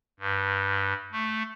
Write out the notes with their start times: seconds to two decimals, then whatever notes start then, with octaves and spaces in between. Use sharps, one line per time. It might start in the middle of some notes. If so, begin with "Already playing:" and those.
0.19 G2
1.12 A3